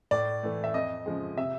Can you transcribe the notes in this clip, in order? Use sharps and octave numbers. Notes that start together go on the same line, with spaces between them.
A2 D5
E3 A3
E5
F2 D#5
C#3 F3 G#3
C3 E5